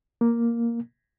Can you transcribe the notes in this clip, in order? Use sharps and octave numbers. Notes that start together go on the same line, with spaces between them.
A#3